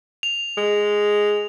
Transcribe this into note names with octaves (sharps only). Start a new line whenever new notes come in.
F7
G#3